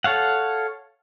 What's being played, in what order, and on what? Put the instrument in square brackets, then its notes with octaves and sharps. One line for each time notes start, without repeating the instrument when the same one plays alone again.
[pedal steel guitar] A4 C#5 F5 F#5